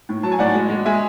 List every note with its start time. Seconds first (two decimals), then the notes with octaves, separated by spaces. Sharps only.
0.09 A2
0.23 F#3 A5
0.32 G#5
0.39 A2 D5 F#5
0.55 G#3
0.70 G#3
0.85 G#3 E5 G#5